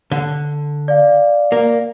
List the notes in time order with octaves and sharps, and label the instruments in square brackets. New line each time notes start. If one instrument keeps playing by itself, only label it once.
[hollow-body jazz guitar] D3
[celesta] D5 F5
[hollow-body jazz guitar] A#3